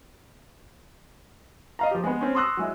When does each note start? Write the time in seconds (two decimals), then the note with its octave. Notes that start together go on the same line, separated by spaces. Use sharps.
1.79 D#5 F5 A#5
1.91 F3 G4
2.04 G#3 B3
2.21 C4 C#4
2.35 C6 C#6 D#6 E6 F#6 A#6
2.57 F#3 G#3 E4